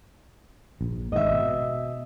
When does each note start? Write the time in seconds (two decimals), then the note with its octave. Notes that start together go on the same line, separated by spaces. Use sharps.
0.81 A#1
1.12 G#1 G#2 D#5 E5
1.31 B2